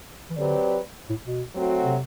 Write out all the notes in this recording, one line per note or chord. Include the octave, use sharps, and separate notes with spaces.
E3
D3 F#3 C4 G4 B4 D5
A2
B2
F#3 A3 C4 F#4
C3